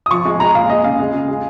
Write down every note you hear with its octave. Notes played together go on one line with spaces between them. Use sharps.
D#6
F3 C#6
G#3
G#3 A#5
A#2 F5
G#3 D#5
C#3 F5
G#3
C#3
G#3